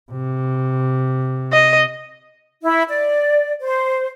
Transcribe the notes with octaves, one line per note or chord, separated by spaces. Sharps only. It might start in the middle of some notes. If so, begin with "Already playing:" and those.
C3
D#5
E4
D5
C5